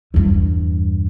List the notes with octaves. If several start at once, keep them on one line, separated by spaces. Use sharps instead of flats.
E2 G2